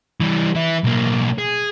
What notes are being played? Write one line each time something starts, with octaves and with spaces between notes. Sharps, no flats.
E3 G3
E3 E4
B1 A#3
G#4